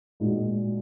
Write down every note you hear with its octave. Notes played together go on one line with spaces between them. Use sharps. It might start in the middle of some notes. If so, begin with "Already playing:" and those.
A#2 G#3 D#4 F#4